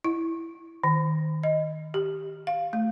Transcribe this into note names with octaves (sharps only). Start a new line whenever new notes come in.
E4
D#3
D#5
G4
F5
A3